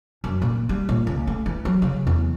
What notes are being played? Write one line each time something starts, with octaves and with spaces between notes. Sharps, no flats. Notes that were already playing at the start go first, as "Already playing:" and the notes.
F#2
A#2
G3
A#2
C#2
A3
E3
F#3
C#3
E2